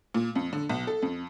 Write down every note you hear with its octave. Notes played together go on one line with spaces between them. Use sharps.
A#2
F2
D3
B1
A4
F2